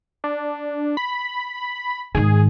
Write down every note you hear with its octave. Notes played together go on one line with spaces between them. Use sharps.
D4
B5
G#2 D#3 G#4